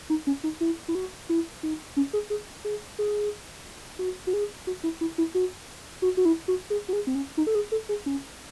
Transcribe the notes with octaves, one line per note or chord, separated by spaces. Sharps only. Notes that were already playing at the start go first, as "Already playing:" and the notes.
D#4
C#4
D#4
E4
E4
F#4
E4
D#4
C#4
G#4
G#4
G#4
G#4
F#4
F#4
G#4
F#4
E4
E4
E4
F#4
F#4
F#4
E4
F#4
G#4
F#4
G#4
C4
C#4
D#4
A4
G#4
A4
G#4
C#4